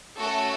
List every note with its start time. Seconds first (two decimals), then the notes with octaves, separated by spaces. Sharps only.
0.18 A3 C#4 F#4 A4